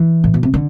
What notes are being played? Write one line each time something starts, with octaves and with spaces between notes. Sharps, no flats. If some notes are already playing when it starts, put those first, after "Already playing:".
Already playing: E3
A2
B2
C3
D3